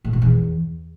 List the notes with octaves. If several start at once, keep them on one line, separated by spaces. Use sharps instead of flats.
A2
B2
E2